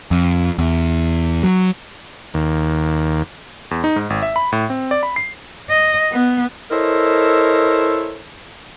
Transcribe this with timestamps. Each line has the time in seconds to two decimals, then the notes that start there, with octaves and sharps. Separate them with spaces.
0.11 F2
0.58 E2
1.43 F#3
2.34 D#2
3.71 E2
3.84 D#4
3.96 G#2
4.10 G#1
4.23 E5
4.36 B5
4.52 A2
4.70 C4
4.91 D5
5.03 B5
5.16 C7
5.70 D#5
6.12 B3
6.71 E4 A4 A#4 C5 C#5 D#5